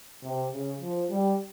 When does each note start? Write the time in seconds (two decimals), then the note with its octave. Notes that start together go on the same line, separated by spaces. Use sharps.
0.23 C3
0.52 C#3
0.81 F3
1.10 G3